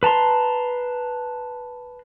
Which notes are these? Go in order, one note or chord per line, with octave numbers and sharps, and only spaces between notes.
B4 A5 A#5 C6